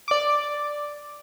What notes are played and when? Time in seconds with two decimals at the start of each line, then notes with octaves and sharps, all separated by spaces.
0.08 D5 D6